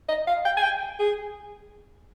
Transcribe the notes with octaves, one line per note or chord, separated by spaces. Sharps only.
D#5
F5
G5
G#5
G5
G#4